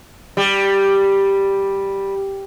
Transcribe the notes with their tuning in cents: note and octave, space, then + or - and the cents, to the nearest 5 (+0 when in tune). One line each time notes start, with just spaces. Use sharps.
G3 +0